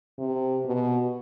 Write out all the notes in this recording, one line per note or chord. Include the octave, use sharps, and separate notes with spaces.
C3
B2